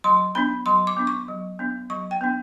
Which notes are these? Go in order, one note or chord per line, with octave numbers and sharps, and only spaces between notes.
F#3 C6
B3 D4 B5
F#3 C6
D6
B3 D4
C#6
F#3
B3 D4
F#3 C#6
G5
B3 D4